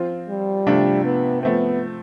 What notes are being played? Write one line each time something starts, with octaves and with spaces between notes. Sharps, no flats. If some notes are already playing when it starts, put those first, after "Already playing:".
Already playing: F3 C4 F4
G3
C3 F3 A3 D4 F4
B3
F3 A3 B3 C4